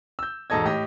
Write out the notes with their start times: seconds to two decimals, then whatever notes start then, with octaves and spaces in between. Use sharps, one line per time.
0.19 E6 G6
0.50 E1 G#2 D#4 A4 D#5 G#6
0.65 A2 G4 D#5